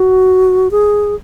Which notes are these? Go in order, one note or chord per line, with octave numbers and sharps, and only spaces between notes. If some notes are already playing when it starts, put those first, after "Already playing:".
Already playing: F#4
G#4